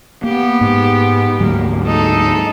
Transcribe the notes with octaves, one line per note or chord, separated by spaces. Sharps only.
A#3 B3 G4
G#2
D2 G#2 F#3 A#3
G#3 D#4 A4